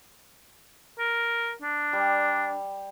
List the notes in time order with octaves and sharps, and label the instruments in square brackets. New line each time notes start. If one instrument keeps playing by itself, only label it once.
[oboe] A#4
D4
[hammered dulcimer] G3